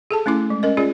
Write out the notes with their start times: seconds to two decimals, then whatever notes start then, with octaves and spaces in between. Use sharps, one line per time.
0.11 G#4 A4 A5
0.26 A3 C#4 E4 D6
0.50 G#3
0.63 C#4 A#4 D#5
0.77 C#4 F4 G#4 D5